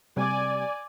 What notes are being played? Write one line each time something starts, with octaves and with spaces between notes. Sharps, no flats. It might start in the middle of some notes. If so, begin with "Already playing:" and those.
C3 G3 D5 G#5